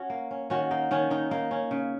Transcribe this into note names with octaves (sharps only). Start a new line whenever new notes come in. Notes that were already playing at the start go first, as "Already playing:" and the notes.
Already playing: C#4 F#4
A#3
C#4
D#3 C#4 F#4
A#3 D#4
D#3 C#4
D#3 D#4
A#3 D#4
C#4
C#3